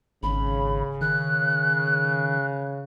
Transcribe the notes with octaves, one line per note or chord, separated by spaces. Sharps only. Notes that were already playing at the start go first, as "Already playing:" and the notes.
G#1 C#3 B5
D#3 F#6